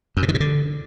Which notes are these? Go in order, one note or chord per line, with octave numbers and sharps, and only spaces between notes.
F#2
B2
D#3
C3
D3